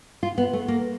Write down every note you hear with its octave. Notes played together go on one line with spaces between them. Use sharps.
F4
B3
A3
A#3